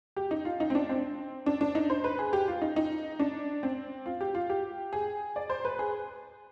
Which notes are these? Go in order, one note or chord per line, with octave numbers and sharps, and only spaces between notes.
G4
D#4
F4
D#4
C4
D4
C4
D4
D4
D#4
C5
B4
G#4
G4
F4
D#4
D#4
D4
C4
F4
G4
F4
G4
G#4
D5
C5
B4
G#4